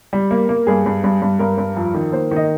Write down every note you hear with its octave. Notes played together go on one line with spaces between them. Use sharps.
G3
A#3
A#3
G2 G#4
G2
G2
G2
G2 A#4
G2
F2
D#3
A#3 C5
D#3 D#5